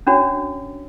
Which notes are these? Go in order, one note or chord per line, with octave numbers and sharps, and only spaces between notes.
C#4 D4 F#4 C#5